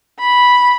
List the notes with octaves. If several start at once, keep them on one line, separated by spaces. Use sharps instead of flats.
B5